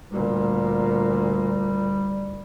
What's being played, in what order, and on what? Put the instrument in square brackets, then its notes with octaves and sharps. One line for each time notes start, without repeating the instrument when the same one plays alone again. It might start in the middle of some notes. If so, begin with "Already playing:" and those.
[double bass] D2 A#2 [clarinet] G3